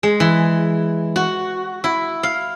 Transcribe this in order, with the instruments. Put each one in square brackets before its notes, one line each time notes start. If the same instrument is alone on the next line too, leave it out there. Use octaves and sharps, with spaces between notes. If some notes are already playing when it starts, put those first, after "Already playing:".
[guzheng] G#3
E3
F#4
E4
F5